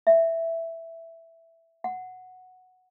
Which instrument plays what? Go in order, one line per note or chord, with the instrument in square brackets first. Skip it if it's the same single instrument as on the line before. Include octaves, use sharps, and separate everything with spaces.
[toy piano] E5
F#5